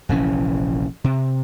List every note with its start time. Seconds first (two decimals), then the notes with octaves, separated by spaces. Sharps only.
0.09 F1 A#1 E3 C#4
1.04 C3